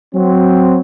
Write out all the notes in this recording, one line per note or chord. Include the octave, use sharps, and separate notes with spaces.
F#3 C4